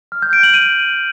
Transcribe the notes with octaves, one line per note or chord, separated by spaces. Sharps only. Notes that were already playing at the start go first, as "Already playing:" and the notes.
F6
G6
D7
F#7
D#7